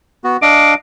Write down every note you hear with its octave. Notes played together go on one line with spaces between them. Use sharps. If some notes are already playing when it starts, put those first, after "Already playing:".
B3 F#4
D4 D#5 F5 D6